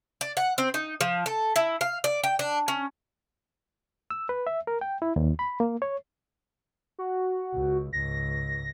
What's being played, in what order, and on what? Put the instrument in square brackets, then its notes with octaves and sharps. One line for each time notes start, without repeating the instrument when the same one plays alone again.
[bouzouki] D5
F#5
C4
D#4
F3
A4
E4
F5
D5
G5
D4
C#4
[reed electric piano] E6
B4
E5
A#4
G5
E4
D#2
B5
A#3
C#5
[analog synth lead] F#4
[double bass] C#2
[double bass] C#2 G#2 [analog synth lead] A#6